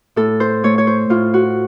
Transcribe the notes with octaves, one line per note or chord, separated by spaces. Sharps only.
A2 A4
C5
A3 C#5
C#5
C5
A2 F4
F#4